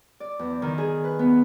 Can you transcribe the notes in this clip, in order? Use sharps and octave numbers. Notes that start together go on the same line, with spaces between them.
D5
E2
D#3
G#4
B4
B3